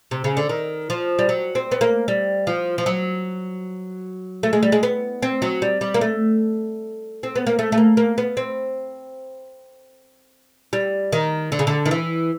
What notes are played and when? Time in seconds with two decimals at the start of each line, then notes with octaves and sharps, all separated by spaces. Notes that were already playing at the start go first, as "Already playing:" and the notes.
0.11 C3
0.24 C#3
0.37 D3
0.49 D#3
0.90 F3
1.19 G3
1.29 F#3
1.55 C4
1.72 B3
1.81 A#3
2.08 G3
2.47 F3
2.78 F3
2.86 F#3
4.43 A3
4.53 G#3
4.63 G3
4.72 G#3
4.83 B3
5.22 C4
5.42 F#3
5.62 G3
5.81 G3
5.94 A#3
6.01 A3
7.23 C4
7.36 B3
7.47 A#3
7.59 A3
7.72 A3
7.77 A#3
7.97 A#3
8.18 B3
8.37 C4
10.73 G3
11.13 D#3
11.52 D3
11.59 C#3
11.67 D3
11.86 D#3
11.91 E3